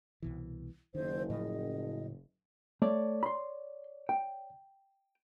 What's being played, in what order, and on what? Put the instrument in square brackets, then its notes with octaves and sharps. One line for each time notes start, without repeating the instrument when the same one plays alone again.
[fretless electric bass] C2 B2 E3
[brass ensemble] F#1 [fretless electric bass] D#3 [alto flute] C5
[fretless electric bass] A2 C#3 F3 [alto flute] D#5
[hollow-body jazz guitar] A3 [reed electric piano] C#5 D5
[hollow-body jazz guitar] B5 C6
G5